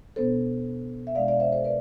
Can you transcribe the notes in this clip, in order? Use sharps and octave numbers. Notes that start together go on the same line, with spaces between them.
B2 B3 D4 A4 C5
E5
B2 G#3 D4 D5 F5
D5 F5
C5 E5
A4 C5
B4 D5